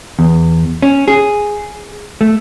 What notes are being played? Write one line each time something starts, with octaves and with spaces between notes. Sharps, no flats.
E2
C#4
G#4
A3